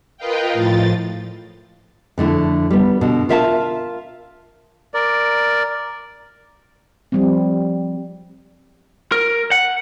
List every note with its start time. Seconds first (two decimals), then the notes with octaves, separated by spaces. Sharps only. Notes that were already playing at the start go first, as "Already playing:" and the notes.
0.17 F4 A#4 B4 D#5 F5 G5
0.53 A2 F3 F4 A6
2.18 F2 D3 A3 E4
2.71 G3 B3
3.01 B2 D3
3.29 F4 A#4 E5 F5 G5 A5
4.94 A#4 D5
7.12 F3 G3 C4
9.12 A#4
9.51 F#5